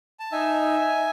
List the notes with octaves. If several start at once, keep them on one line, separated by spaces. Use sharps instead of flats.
A5
D#4 E5 G#5